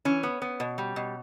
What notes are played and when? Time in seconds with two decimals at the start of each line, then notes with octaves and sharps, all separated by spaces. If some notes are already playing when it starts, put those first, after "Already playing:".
0.05 E3 C#4
0.23 B3
0.42 B3
0.60 B2
0.78 G3
0.96 B2